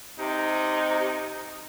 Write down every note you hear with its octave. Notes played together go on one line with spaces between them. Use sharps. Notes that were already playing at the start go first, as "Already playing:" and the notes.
C3 D#4